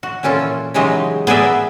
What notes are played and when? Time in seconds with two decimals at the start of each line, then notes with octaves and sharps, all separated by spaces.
0.03 F#4
0.23 A#2 E3 C#4 F4 A4
0.74 C#3 E3 F#3 G#3 D#4 G4
1.27 B3 G#4 A#4 D5 E5